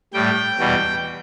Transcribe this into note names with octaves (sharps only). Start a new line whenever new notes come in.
A2 G3 G5
E2 B2 G3